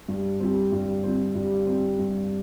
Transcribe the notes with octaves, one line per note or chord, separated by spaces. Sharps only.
G2
G3 C4
G2
G3 C4
G2
G3 C4
G2